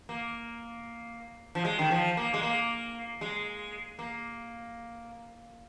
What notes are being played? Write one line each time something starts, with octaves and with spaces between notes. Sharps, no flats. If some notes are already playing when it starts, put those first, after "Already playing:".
A#3
F3
G#3
D#3
F3
A#3
G#3
A#3
G#3
A#3